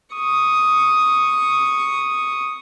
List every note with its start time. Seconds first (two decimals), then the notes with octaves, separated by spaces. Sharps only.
0.15 C#6 D#6